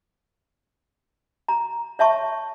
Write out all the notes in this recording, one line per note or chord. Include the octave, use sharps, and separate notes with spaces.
A#5
C#5 E5 A5 C#6